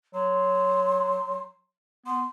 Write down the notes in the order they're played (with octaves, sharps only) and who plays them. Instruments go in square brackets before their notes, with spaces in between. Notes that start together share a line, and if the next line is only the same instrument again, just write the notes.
[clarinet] F#3 [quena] C6
[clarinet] B3 [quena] C6